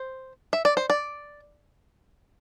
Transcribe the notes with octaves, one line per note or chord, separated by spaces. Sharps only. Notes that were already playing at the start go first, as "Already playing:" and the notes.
Already playing: C5
E5
D5
C5
D5